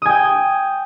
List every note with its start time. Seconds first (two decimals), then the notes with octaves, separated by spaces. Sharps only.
0.02 D#6
0.06 G#5
0.09 G5